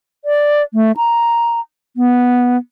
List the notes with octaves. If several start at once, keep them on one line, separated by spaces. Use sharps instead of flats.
D5
A3
A#5
B3